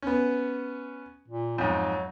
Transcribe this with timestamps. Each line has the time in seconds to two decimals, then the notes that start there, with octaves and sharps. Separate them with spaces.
0.02 B3 C#4
1.28 A#2
1.58 F2 G#2 F#3